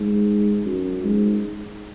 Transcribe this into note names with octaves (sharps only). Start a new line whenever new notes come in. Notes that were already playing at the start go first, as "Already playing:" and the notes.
Already playing: G#2
F#2
G#2